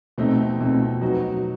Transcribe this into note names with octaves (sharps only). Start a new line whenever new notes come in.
B2 A3 C4 D#4
B2 A3 C4 D#4
F#3 B3 D#4 F#4